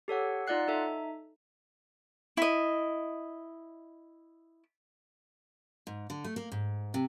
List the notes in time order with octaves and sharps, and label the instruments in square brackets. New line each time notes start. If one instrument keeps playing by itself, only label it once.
[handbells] G4 A4 C#5 F#5
D#4 F4 D5 F#5 F#6 C7
D#4 A4 E5
[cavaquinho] E4 D#5
[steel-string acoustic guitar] G#2
D3
A3
A#3
G#2
C3